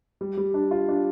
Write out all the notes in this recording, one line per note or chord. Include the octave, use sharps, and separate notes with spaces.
G3
G3
D4
F4
D4